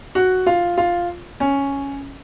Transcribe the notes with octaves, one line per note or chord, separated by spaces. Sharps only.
F#4
F4
F4
C#4